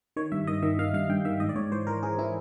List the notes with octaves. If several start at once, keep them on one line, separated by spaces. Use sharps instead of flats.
D#3 C#5
G2 E5
D#3 D#5
D#3 E5
D#3 F5
G2 F5
G2 G5
D#3 E5
G#2 D#5
D5
G#2 C#5
E3 C5
E3 A#4
E3 G#4
E3 E4